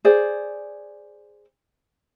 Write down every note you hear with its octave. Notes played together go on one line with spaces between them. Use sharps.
G#4 C5 D5